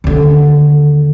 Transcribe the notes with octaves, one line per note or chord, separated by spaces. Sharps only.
D#2 D3